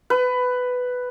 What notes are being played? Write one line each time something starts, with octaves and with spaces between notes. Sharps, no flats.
B4